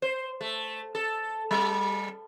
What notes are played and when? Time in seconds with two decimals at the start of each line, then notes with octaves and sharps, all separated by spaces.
0.02 C5
0.41 A3
0.95 A4
1.51 G3